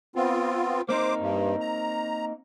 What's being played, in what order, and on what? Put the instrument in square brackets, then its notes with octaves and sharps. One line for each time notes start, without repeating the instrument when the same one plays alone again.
[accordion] B3 C4 F4
[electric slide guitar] A#3 C4 D#4 [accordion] C5 D6
[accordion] G2
A#5